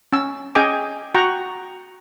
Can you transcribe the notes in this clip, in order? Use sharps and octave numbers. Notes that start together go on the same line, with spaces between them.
C#4 E6
C#4 G#4 D#5 G5 G#5 D6
F#4 F#5 G5 A#5 C#6